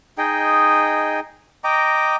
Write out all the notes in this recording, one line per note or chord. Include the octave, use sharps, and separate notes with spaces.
D#4 G#4 D#5 G5
D#5 G5 A#5 D6